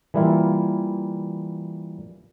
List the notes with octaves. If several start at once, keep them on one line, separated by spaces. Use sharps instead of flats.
E3 G3 A#3 E4 F4